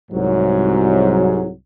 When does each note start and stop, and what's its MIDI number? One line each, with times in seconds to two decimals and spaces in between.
0.12 1.50 36
0.12 1.50 44
0.12 1.50 54